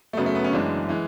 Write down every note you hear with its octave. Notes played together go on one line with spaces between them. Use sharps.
A3
F#2 C#3 F#3 B3
A3
B3
C#4
F#1 F#2 E3 G#3 D4
E3 G#3